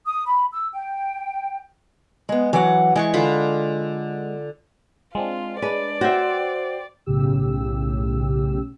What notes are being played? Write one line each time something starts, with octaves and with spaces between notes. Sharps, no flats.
D#6
B5
E6
G5
G#3 B3
E3 F#3 F#5 D6
E3 G#3 B4 C#6
D3 F4 B5
G#3 C4 D4 F4
G#3 D4 B4 D5
F#4 C5 E5 G5 C6
B1 A2 C#3 G4 E6